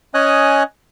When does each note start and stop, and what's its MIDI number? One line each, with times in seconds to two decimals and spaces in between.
0.14 0.63 61
0.14 0.63 73
0.14 0.63 75
0.14 0.63 80
0.14 0.63 87
0.14 0.63 90